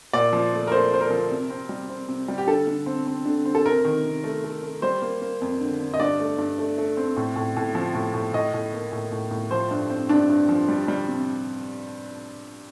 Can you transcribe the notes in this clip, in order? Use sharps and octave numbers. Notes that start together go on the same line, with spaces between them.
A#2 D5
F3
A3
A#4
A3 C5
A3 C5
A#4
F3
C3
C4
G3
C4
C3
G3
G4
D3 A4
D3
C4
C4
D3
C4
A4
C3 A#4
D#3
C3
A3
A3
A3
G3 C5
A#3
A#3
F2
D3
D3
D#5
G2 D5
A3
G2
A3
A3
C4
A2
A2
A2
F3
A2
A2
A2 D#5
A2
A#3
A2
A2
A2
F3 C5
G2
C4
G2 D4
G2
F3
G3
G3
C3